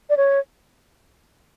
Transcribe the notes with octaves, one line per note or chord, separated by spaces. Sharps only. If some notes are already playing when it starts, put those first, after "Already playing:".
D5
C#5